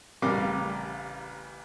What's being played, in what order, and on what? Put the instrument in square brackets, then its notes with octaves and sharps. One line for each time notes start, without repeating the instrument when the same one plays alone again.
[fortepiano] A1 C#3 G3 A#4 F5 D6